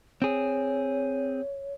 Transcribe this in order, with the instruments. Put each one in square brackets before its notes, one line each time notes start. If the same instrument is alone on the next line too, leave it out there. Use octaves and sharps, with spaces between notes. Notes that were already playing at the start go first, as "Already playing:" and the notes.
[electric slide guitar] C4 G#4 [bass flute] C#5